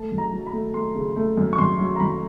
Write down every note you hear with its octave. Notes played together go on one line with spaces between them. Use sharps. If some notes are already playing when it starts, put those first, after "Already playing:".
Already playing: A3 A5
F#2
A#5
F#3
B5
A3
A3 C6
C#3
A3
F#2
C#6
F#2 C6
F#3
A#5
F#2 B5